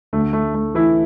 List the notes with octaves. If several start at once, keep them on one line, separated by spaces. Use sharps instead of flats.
D2 D3 A3
A3
A3
E3 E4